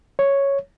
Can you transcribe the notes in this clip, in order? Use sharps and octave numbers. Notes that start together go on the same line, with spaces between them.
C#5